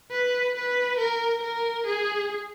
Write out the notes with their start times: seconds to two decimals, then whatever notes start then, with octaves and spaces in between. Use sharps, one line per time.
0.11 B4
0.56 B4
0.99 A#4
1.43 A#4
1.87 G#4